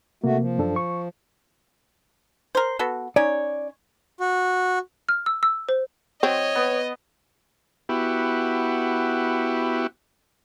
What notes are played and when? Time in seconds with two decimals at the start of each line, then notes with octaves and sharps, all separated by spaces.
0.24 C3 A3 A#3 F#4
0.39 F3
0.58 F#2 D4 A4
0.76 C#6
2.55 A#4 C5
2.79 B3 F#4 A4
3.16 C#4 D#4 C#5 D5
4.20 F#4
5.09 F6
5.26 E6
5.43 E6
5.69 C5
6.23 F#3 C4 C#5 D#5
6.55 B3
7.89 B3 E4 F#4 G4